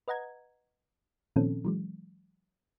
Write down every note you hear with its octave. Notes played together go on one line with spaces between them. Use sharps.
B4 D#5 F#5 A#5 G#6
A#2 D#3 F3 C4 C#4 A4
E3 F#3 G#3